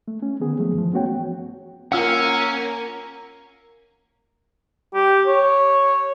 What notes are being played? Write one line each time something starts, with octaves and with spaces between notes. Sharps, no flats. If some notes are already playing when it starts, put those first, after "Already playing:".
A3
C#4
D3 D#3 B3 G#4
F3 F#3 A3
G2 E3 F3
A3 B3 C#4 F#4 C#5 G5
A#3 C#4 F4 A#4 F5 F#5 E6 F6
G4
C#5